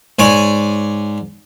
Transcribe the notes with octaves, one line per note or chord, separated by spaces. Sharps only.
G#2 C#5 D5 G#5 D6